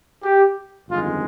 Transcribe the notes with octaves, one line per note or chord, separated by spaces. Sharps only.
G4
G1 F2 D#3 G#3 F4